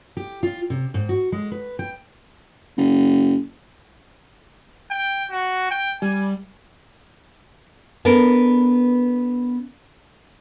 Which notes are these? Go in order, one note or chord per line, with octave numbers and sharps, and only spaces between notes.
G4
F4
C3
G#2
F#4
G#3
B4
G5
F#1
G5
F#4
G5
G3 G#5
B3 D4 A4 A#4